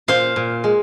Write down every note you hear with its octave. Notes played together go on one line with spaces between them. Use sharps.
A#2 C5 F5
A#2
G#3